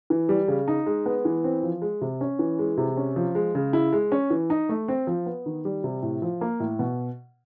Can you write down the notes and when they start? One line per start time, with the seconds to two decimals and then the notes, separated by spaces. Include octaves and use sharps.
0.10 E3
0.29 G3
0.48 C#3
0.68 D#4
0.86 G#3
1.06 B3
1.25 E3
1.44 C4
1.63 F3
1.82 G#3
2.01 C3
2.21 C#4
2.39 E3
2.59 G#3
2.77 C3
2.97 C#4
3.16 F3
3.35 G#3
3.55 C#3
3.73 E4
3.93 G#3
4.12 C#4
4.30 E3
4.50 D#4
4.69 A3
4.88 C4
5.07 F3
5.26 B3
5.46 D#3
5.65 G3
5.84 C3
6.03 A2
6.22 F3
6.41 A#3
6.60 A2
6.79 B2